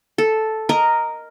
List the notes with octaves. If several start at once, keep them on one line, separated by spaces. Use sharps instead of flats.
A4
A#4 D#5